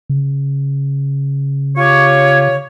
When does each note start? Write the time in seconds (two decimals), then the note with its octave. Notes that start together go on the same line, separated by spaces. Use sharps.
0.10 C#3
1.76 F4 G4 C#5